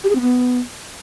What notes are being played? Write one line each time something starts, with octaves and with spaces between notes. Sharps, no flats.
G4
G#4
C4
B3